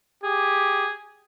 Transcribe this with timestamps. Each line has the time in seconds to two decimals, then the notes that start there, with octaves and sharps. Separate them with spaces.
0.24 G4 G#4